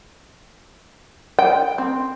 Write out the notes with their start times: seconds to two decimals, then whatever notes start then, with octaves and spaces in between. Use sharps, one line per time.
1.39 G5
1.78 C4